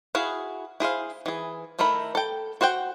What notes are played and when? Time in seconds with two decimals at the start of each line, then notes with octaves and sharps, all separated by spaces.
0.15 E4 F#4 G#4 F5
0.80 E4 G#4 C5 F5
1.26 E3 G#4
1.79 D#3 A3 E4 A#4 B5
2.15 A4 G5
2.61 F#4 C5 F#5 G5